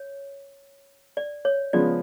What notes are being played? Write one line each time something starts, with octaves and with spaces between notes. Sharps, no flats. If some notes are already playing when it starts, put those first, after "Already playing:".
Already playing: C#5
D5
C#5
C#3 F3 G#3 B3 F4 D5